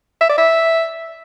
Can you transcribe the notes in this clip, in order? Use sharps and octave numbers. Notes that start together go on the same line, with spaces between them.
E5
D5
E5